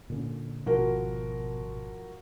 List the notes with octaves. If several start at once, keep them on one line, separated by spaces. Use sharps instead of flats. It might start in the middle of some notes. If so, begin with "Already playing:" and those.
A#2 D3 C#4
G#1 B2 F3 F#4 A#4